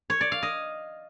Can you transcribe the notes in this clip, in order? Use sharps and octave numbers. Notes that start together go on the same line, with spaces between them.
C#5
D5
F5
D#5